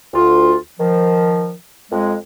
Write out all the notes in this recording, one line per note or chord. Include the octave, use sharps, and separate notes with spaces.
D2 F4
D#3 F3
F2 G#3